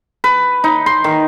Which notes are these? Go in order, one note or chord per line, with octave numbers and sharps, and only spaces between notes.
B4
D#4
C6
D#3